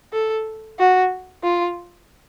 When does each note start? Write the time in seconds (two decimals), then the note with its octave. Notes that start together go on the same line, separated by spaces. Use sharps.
0.13 A4
0.79 F#4
1.44 F4